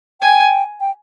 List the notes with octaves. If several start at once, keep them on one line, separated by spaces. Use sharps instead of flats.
G5 G#5
G5